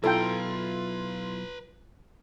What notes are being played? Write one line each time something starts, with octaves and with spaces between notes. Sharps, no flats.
B1 E4 F4 A4 B4 G5 A#5